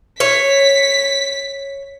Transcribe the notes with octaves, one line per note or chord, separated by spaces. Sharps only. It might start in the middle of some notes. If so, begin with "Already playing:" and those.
C#5 B6